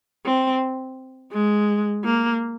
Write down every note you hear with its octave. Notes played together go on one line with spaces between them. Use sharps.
C4
G#3
A#3